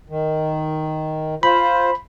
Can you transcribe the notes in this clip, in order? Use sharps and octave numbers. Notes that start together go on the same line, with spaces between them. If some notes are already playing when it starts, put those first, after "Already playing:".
D#3
F4 C5 B5